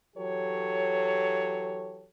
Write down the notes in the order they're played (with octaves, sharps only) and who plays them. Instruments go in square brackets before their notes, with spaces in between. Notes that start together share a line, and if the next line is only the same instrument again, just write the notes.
[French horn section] E3 F#3 G4 A4 C#5